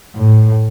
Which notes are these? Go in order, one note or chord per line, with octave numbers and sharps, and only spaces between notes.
A2